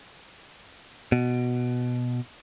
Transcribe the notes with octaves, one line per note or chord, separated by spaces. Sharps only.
B2